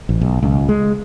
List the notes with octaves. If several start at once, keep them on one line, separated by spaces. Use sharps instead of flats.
A1
B1
C#2
G#3